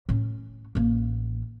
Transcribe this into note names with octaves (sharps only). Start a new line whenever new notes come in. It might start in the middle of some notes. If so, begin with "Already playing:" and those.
A2 C#4
A1 A#3